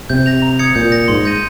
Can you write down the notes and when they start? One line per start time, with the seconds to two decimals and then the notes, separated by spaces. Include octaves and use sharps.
0.10 C3 G6
0.26 A#6 F7
0.42 A#5
0.59 D#6 G#6 C#7
0.75 A#2 G6
0.92 A#6 C#7
1.08 G#2 C6
1.25 G6 A#6 D#7